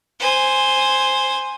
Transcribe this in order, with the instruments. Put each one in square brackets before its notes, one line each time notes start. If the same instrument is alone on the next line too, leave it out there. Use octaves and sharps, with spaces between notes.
[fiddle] C5 G#5